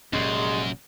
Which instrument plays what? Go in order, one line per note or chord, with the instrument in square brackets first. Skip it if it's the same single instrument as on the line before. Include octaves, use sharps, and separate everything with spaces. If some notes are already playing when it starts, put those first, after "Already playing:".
[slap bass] F1 A#2 C#4 [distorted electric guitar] F#2 [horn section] G3 G#3